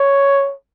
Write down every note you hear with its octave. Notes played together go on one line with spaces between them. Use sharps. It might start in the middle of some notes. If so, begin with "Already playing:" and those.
Already playing: C#5